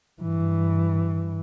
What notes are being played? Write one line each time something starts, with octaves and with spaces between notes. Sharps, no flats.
G2 E3